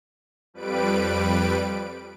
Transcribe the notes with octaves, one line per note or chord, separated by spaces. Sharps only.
F2 G3 B4 D7